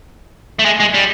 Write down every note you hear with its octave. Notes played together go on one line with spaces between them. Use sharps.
A3
G#3
G#3
G3